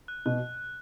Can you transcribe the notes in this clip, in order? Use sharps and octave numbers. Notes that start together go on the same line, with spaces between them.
F#6
B2 F#6